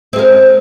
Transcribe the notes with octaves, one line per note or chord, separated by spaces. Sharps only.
G#3 C4 A#4